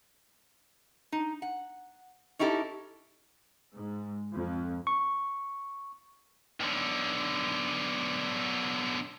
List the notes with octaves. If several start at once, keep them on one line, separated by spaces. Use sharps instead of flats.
D#4
F#5
C#4 D#4 E4 G4 A4
G#2
F2
C#6
B1 D3